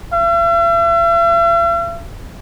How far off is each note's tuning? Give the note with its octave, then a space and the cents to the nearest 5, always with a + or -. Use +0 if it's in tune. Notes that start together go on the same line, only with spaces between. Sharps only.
E5 +45